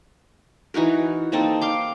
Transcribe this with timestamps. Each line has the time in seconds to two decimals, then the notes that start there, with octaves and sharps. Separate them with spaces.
0.74 E3 D#4 F#4 A#4
1.32 A#3 C4 D#4 A4
1.61 F5 C6 D6